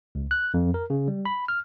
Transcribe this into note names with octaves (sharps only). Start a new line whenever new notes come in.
C#2
F#6
F2
A#4
C#3
G3
B5
F6